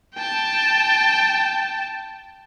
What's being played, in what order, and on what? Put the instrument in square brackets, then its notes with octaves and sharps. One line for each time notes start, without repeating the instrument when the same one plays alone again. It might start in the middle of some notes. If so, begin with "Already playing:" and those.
[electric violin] G5 A5